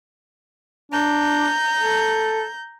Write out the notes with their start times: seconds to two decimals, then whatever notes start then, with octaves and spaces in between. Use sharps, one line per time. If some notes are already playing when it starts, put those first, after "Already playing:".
0.92 D4 A#5 G6
1.79 A4